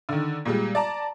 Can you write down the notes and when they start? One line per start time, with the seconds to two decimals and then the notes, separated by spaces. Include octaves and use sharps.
0.09 D3 D#3
0.45 A#2 G3 G#3
0.75 D5 A5 A#5